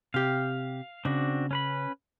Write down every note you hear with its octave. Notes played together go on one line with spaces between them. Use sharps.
C3 G4 F5
C#3 C4 D4 F#4
C#4 B4 B5